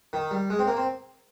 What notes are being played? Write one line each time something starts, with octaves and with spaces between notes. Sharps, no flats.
D#3
G3
G#3
C4
A#3
C4